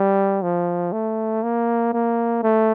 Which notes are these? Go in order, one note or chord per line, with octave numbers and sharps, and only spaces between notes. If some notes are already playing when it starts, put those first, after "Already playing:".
Already playing: G3
F3
A3
A#3
A#3
A3